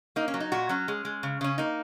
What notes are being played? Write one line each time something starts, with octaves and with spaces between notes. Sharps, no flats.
A#3 D#4
C#4
F#3
D#4
A#2 F#4
F#3 C#4
G#3
G#3
C#3
C#3 C#4
A#3 D#4